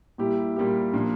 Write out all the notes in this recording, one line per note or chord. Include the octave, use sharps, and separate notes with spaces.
A#2 G3 A#3 E4 G4
A#2 G3 A#3 E4 G4
A#2 F3 A#3 D4